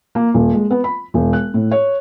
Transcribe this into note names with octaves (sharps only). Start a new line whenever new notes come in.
A#3
D#1
G#3
B3
B5
E1
F#6
A2
C#5